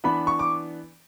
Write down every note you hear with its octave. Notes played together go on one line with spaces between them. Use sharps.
E3 B3 D4 B5
C#6
D6